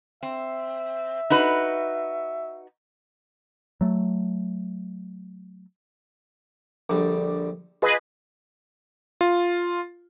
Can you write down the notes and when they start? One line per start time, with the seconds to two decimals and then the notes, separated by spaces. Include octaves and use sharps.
0.23 C4 E5
1.30 D#4 F#4 B4
3.81 F#3 A3
6.90 A#1 D3 G3
7.82 F4 G#4 B4 D#5
9.21 F4